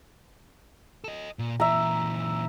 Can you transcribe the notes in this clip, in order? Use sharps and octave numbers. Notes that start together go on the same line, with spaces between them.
A4 D#5
A#2
A#2 E3 E5 A#5